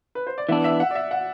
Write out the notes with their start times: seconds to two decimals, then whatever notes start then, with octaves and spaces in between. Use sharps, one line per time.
0.15 B4
0.27 C5
0.38 D5
0.49 E3 B3 D4 E5
0.64 E5
0.80 F#5
0.91 D5
0.95 E5
1.11 F#5